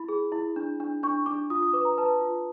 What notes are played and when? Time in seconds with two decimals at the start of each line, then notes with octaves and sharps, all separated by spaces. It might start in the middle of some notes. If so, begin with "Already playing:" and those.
Already playing: E4 B5
0.09 G#4
0.32 E4
0.56 D4
0.80 D4
1.03 D4 C#6
1.26 D4 D6
1.50 F4 D#6
1.63 D#6
1.73 B4 D6
1.85 A#5
1.98 B4 A5
2.21 F4